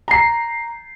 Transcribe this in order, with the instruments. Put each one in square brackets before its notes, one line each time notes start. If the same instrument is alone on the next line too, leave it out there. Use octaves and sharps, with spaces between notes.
[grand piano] A#5 C7